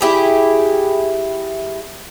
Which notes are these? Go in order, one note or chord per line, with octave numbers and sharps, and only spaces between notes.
E4 G4 G#4